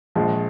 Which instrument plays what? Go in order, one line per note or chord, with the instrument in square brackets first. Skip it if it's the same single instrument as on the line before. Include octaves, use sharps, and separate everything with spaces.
[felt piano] A#1 [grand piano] F3 G#3